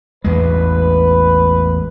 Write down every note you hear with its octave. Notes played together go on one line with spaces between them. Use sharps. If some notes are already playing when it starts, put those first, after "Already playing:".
A1 E2 G#3 B4